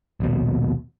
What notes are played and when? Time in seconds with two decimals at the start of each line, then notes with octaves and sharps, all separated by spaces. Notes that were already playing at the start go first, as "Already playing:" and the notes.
0.20 A#1 D#2 B2